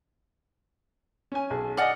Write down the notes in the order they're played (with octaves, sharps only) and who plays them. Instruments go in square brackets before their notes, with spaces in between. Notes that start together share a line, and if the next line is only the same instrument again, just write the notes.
[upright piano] C#4 G#5
B1 G#4
[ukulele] D5 F#5 [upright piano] D#5 G#5 F6